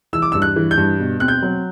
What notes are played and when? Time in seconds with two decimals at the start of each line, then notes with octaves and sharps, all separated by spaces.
0.13 E3 E6
0.22 D6
0.32 E6
0.35 G2
0.42 F#6
0.56 E3
0.71 G6
0.78 G2
1.00 B2
1.20 C4 F#6
1.28 G6
1.42 F#3